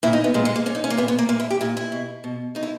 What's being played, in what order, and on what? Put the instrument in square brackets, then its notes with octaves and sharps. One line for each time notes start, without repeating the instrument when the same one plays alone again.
[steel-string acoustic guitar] A#2 E4
D#4
B3
A#2 G#3
G#3
A#3
A#2 C#4
D#4
C#4
A#3
A#2 B3
B3
A#3
A#2 A#3
E4
G4
A#2 E4
E4
B2
B2
B2 D#4
E4